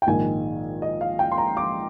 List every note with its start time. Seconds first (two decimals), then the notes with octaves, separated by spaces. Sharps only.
0.02 G5
0.07 A#1 G#2 D#3 G#3 G#5
0.82 D#5
1.01 F5
1.19 G5
1.32 C6
1.38 A#5
1.57 D6